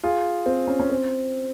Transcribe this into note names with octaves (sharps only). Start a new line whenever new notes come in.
F4 G#4
C4
C#4
C#4
C4